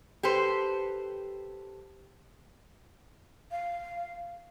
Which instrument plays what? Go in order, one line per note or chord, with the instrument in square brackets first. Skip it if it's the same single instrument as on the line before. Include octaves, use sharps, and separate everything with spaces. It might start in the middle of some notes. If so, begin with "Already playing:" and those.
[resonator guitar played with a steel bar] G4 A4 B4 C5
[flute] F5